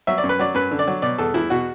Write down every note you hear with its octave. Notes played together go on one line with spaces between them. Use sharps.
F#3 E5
D5
F#2
B4
F#3 D5
F#2 B4
D3
D5
F#3
B2 D5
E2 A4
E2 E4
B2 F#4